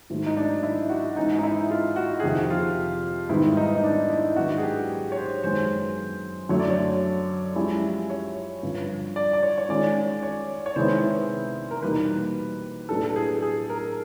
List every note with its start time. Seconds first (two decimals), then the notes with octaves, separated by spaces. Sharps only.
0.10 G#2 D#3 F#3 A3
0.26 D#4
0.37 D4
0.63 E4
0.90 F#4
1.16 G#2 E3 G#3 C#4 D#4
1.38 D#4
1.43 E4
1.71 F4
1.96 F#4
2.20 G#4
2.23 F2 C3 D#3 G4
2.50 F4
3.29 G#2 D#3 G3 B3 E4
3.57 D#4
3.77 D#4
3.84 D4
4.10 E4
4.36 G#2 D#3 F#3 B3 D4 F#4
4.58 G#4
4.63 G4
5.12 C#5
5.16 C5
5.44 F#2 D#3 G#3 B3 C5
6.49 F#2 D3 F#3 A3 C#5
6.60 D5
6.70 C#5
7.56 F3 G#3 C#4 E4 G4
8.10 C#5
8.63 G2 D3 F3
9.16 D5
9.33 D5
9.43 C#5
9.58 C#5
9.69 D#3 G#3 C#4 F4 D5
10.23 C#5
10.66 C#5
10.76 C3 D#3 G#3 B3 E4 C5
11.71 A#4
11.82 E2 B2 G3 A#3 D#4 B4
12.89 A2 F#3 B3 D4 G4 A4
13.04 A4
13.16 G#4
13.43 G#4
13.70 A#4